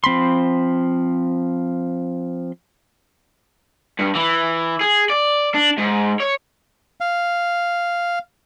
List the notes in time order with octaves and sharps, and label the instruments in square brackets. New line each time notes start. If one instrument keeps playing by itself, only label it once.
[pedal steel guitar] F3 C4 B5 C6
[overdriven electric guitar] G2
E3
G#4
D5
D4
G#2
C#5
[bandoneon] F5